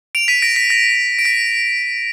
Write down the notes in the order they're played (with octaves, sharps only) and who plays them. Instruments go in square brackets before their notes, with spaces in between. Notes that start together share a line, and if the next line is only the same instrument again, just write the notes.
[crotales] D7 F7
B6 D#7
A#6 D7
B6
A#6
D7
B6